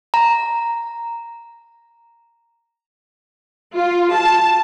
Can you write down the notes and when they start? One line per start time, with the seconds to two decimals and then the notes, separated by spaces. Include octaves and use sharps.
0.14 A#5
3.75 F4
4.15 A5